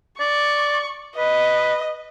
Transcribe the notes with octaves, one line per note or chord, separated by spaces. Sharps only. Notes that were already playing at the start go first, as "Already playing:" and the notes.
D5 C#6
B4 D#5